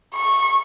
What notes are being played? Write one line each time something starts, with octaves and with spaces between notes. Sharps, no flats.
C#6